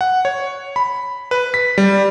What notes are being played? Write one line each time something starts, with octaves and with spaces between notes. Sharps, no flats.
F#5
C#5
B5
B4
B6
G3